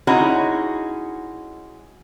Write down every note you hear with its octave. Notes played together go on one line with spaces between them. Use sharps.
G#3 C#4 D#4 E4 F#4